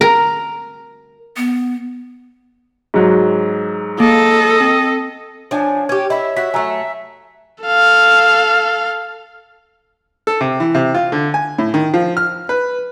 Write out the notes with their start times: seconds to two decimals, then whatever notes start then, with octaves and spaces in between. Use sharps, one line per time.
0.01 A#4
1.37 B3
2.94 G#2 F#3
4.00 A#3 A4 D#5
4.61 C4
5.51 F3 D4 C#5 G#5
5.89 C#4 G4 G#6
6.10 E4 D#5 E5 B5
6.37 F#4 E5 B6
6.54 F#3 A3 G#5 A#5 E6
7.64 A4 F5
10.27 A4
10.41 C3
10.60 E3
10.75 C3
10.94 F4
11.12 D3
11.34 G#5
11.59 A2
11.74 D#3
11.94 F3
12.17 F6
12.49 B4